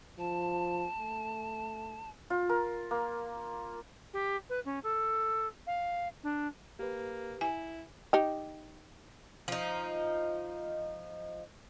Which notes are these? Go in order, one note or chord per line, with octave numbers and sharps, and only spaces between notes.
F3 A5
A3
F4
A#4
A#3
G4
B4
C#4
A4
F5
D4
A#3 G4 B4
E4 G#5
D#4 G4
F3 D#4